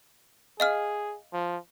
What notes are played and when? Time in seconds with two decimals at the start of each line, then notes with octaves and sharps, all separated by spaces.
0.60 G#4 D#5 F5 F6
1.33 F3